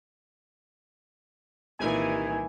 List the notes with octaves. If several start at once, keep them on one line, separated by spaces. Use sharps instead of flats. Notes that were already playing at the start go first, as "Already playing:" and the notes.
C2 A#2 D#3 E3 G#5